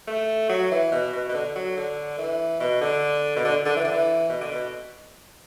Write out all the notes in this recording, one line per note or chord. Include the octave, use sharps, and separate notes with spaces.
A3
F#3
E3
B2
B2
B2
D3
F#3
D3
E3
B2
D3
B2
D3
D3
E3
D3
E3
B2
D3
B2